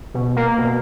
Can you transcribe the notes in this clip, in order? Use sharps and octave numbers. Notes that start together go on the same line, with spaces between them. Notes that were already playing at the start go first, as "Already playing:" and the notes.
B2
A#3
B2